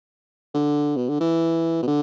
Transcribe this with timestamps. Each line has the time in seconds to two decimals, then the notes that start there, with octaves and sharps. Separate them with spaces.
0.54 D3
0.96 B2
1.08 D3
1.20 E3
1.82 B2
1.87 D3